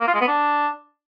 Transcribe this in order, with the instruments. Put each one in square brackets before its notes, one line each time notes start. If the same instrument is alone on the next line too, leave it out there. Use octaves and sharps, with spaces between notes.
[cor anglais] A#3
F4
G#3
B3
D4